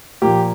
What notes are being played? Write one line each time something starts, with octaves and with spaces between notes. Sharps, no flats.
A#2 F3 A#3 G4